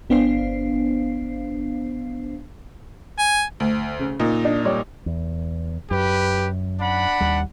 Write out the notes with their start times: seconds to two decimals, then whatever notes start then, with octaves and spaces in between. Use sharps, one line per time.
0.10 G1 B3 D4 C5 F5 C7
3.19 G#5
3.60 D2
4.00 C#3
4.20 A#2 D#4
4.45 D4
4.65 G3 C#5 D5
5.06 E2
5.91 F#2 G4 B4
6.80 D4 F#5 B5
7.20 D#2 G3